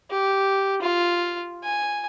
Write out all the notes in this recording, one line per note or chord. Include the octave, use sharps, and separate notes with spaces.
G4
F4
G#5